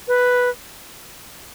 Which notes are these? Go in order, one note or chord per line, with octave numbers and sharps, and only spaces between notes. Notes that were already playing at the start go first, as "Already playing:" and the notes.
B4